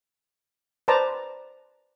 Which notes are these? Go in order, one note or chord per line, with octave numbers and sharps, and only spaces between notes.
B4 C5 D5 A5 A#5